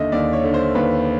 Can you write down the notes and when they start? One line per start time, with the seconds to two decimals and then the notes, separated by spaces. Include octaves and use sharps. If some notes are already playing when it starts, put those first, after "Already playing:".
Already playing: D#2 D3 D#5 E5
0.12 D#2 D5
0.33 C#5
0.44 D3
0.54 C5
0.75 D#2 B4